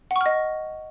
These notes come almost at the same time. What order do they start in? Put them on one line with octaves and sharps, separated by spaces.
F#5 C#6 F6 D#5